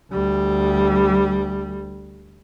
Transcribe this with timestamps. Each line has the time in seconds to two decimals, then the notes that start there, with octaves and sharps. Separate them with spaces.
0.11 D2 G3